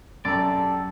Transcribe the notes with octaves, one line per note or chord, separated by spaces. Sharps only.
F#2 G4 A4 D5 A#5